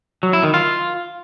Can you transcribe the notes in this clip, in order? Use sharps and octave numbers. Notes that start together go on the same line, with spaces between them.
F#3
E4
D#3
F4